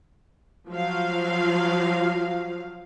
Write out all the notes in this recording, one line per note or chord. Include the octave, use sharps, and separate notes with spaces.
F3 F#3 F5